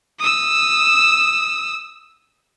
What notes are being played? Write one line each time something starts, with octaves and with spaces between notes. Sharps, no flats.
D#6 E6